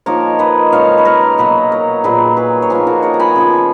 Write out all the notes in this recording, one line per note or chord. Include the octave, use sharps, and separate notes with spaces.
F3 A#3 D#4 A#4 C#5
B4 D#5
C#3 G#3 D#4 C#5 F5
B4
A#4 C#5
B2 F#3 A#3 B4 D#5
A#4 C#5
A#2 F#3 A#3 G#4 B4
G#4 B4
C#5
F3 A#3 D#4 G#4 B4
F#4 A#4
A#4 C#5
A#5
G#5 B5
C#3 F3 B3